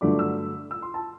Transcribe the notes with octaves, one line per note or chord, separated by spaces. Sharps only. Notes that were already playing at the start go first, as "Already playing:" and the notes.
G2 D3 F#3 A3 D4 D6
E6
E6
C6
A5